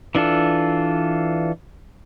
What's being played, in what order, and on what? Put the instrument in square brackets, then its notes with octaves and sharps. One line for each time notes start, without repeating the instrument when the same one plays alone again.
[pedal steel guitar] E3 D4 F4 A4